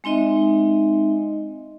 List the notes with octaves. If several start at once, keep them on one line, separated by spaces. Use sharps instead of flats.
G#3 C4 D#4 D#5 E5